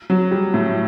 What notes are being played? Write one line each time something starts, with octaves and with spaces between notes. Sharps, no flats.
F#3
G3
A2